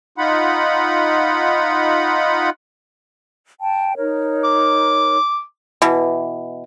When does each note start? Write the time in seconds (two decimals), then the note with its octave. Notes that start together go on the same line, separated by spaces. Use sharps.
0.18 D#4 F4 F#5 B5
3.60 G5 A5
3.97 D#4 A#4 C#5
4.45 D6
5.82 B2 E3